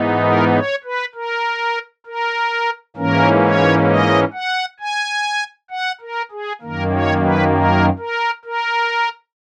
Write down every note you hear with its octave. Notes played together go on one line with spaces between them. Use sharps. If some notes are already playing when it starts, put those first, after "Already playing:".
Already playing: G#2 E3 B3 D#4
A#4
C#5
B4
A#4
A#4
G#2 E3 A#3 C#4 A#4
C#5
D#5
F#5
G#5
F#5
A#4
G#4
F#2 D#3 A#3 A#4
C#5
B4
A#4
A#4
A#4